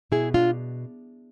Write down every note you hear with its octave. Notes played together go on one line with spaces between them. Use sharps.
B2 E4 G#4
D4 F4